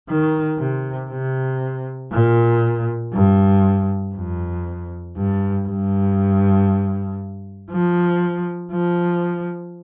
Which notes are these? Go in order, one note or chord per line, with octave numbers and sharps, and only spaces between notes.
D#3
C3
C3
A#2
G2
F2
G2
G2
F3
F3